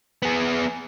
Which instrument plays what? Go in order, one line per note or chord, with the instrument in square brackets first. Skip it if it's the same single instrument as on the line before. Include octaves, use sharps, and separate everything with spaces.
[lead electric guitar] B3 G#4